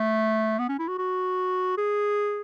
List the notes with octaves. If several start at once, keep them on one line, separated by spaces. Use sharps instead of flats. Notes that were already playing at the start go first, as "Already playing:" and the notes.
Already playing: A3
B3
C#4
E4
F#4
F#4
G#4